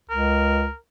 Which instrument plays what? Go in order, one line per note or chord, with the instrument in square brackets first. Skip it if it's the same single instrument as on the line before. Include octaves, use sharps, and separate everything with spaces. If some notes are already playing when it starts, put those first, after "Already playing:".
[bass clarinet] C#2 [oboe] A#4